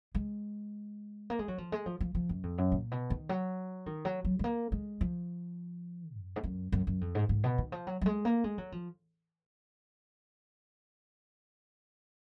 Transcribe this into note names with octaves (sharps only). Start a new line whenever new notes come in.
G#3
A#3
G#3
F#3
F3
G#3
F3
F3
F3
F#2
F2
F#2
A#2
B2
D#3
F#3
D#3
F#3
F#3
G#3
A#3
G#3
F3
F#2
G#2
F#2
F#2
F#2
F2
G#2
G#2
B2
D#3
F3
F#3
F#3
G#3
A#3
G#3
F#3
F3